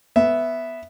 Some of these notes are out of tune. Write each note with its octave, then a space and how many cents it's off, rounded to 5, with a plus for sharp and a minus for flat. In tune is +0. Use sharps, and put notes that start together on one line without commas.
B3 +0 E5 +0